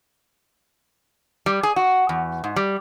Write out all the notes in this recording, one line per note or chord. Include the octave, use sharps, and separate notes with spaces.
G3
G#4
F#4
E2
G#2
G3